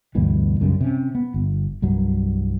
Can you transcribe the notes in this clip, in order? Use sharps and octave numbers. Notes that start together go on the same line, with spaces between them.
D2 G2 B2 E3
B1 F#2 C#3 G3
C3 C#4
B3
G1
C2 G2 F#3